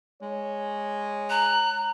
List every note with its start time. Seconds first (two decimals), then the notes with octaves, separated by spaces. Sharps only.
0.22 G#3 C#5
1.30 A#5 F#6